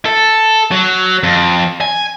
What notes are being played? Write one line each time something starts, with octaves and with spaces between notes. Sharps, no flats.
A4
F#3
F2
G#5